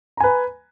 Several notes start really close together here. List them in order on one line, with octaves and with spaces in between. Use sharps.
A#5 G#5 B4